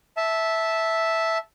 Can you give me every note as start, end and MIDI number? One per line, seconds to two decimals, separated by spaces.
0.17 1.38 76
0.17 1.38 81